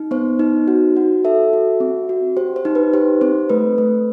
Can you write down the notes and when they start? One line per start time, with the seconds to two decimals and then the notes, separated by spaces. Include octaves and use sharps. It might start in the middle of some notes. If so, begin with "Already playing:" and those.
Already playing: D#4
0.11 B3 C5
0.39 D#4
0.68 F#4
0.97 F#4
1.25 A4 E5
1.53 F#4
1.80 C4
2.09 F#4
2.37 G4 C5
2.56 C5
2.65 D#4
2.75 B4
2.94 G4 C5
3.21 C4 C5
3.50 A3 B4
3.78 A3